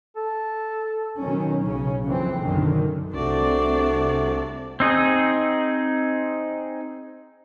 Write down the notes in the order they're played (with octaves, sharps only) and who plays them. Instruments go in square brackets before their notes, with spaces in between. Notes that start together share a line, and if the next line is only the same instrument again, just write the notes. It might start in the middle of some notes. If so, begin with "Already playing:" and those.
[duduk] A4
[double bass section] B2 D#3 F#3 C#4
B1 C#3 C#4
F2 E3 C4
B1 F#2 D3 D#3
[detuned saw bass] C2 [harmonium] C3 A3 F#4 [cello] C4 [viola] D4 D5
[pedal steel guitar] C4 D#4 G#4